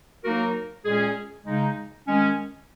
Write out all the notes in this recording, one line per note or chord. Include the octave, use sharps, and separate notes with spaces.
F#3 A#3 D#4 F#4 A#4
A#2 G#3 C#4 G#4
C#3 G#3 D#4
D#3 G#3 C#4